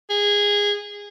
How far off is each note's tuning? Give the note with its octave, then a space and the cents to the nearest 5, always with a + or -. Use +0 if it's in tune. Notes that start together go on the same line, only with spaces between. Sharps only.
G#4 -15